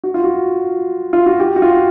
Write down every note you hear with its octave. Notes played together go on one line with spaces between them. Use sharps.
F#4
F4
F#4
F4
F#4
G4
F#4
F4